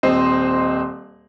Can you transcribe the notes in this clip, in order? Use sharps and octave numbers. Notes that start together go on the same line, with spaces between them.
D#1 C4 C5 D#5